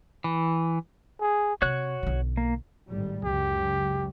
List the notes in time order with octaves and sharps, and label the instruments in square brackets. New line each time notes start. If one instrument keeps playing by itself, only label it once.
[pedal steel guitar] E3
[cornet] G#4
[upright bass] C3 [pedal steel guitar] F#4 C#5 F#6
[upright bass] B1 D3
[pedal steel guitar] A#3
[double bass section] G#1 A2 G3
[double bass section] C#2 F#2 C#3 [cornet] G4